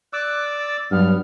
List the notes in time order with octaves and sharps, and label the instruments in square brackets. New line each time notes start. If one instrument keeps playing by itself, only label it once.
[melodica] D5 D6 E6 [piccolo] F#6
[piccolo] A6
[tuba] G2 [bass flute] F#3 [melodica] B3 [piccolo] F6